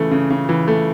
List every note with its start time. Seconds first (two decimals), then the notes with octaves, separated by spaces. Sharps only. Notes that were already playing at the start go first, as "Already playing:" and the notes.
Already playing: C#3 E3 A3
0.11 C#3
0.30 C#3
0.49 E3
0.68 A3